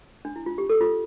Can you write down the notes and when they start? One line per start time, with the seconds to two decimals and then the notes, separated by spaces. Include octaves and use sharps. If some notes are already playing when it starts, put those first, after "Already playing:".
0.25 D4
0.36 E4
0.46 F4
0.58 G4
0.70 A4
0.81 F4